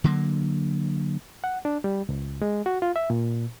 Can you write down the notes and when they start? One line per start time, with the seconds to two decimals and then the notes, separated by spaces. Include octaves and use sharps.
0.04 D3 F#3 A#3
1.44 F#5
1.65 D4
1.84 G3
2.09 C#2
2.42 G#3
2.66 F#4
2.82 F4
2.96 E5
3.10 A#2